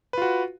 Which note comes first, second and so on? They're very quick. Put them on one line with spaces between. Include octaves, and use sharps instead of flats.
B4 F4 F#4